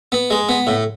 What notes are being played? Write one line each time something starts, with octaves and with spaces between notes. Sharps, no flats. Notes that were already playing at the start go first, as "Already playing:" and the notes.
B3
G#3
B3
A2